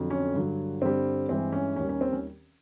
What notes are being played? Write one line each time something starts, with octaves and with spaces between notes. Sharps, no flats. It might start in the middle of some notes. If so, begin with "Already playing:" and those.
Already playing: F2 D3 F#3
C#4
G2 D3 F#3
G2 D3 G3 C4
G2 E3 G#3 C4
C#4
D#2 D#3 G3 C#4
C#4
C4
C#4